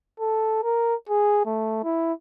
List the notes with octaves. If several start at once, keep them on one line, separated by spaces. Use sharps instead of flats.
A4
A#4
G#4
A3
E4